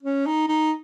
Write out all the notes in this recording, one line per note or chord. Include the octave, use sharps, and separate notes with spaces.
C#4
D#4
D#4